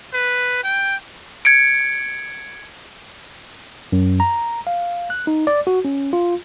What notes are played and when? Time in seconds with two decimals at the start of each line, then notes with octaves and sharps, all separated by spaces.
0.14 B4
0.64 G5
1.45 G#6 C#7 D7
3.92 F#2
4.20 A#5
4.67 F5
5.10 F#6
5.27 D#4
5.47 D5
5.67 F#4
5.85 C#4
6.13 F4